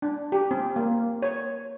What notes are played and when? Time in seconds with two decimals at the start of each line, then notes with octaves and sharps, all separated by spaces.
0.02 D4
0.32 G4
0.51 C4
0.76 A#3
1.22 C#5